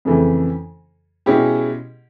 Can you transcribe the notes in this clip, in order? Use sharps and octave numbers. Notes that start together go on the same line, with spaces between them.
F2 C#3 E3 A3
B2 G#3 C#4 E4 G4